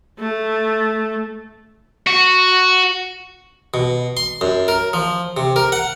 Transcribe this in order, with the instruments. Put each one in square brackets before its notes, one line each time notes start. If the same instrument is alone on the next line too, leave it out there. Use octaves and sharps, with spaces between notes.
[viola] A3
[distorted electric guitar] F#4
[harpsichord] B2
C6
F#2
A#4
F3
C3
A#4
F#5